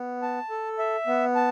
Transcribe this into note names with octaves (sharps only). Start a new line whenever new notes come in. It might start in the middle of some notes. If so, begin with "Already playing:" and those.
Already playing: B3
A5
A4
E5
B3
A5